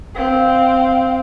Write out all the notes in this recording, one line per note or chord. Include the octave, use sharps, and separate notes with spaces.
C4 F5